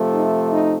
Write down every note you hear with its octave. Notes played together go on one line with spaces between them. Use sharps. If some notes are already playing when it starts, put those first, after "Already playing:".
Already playing: C3 F3 A3
D#4
D#4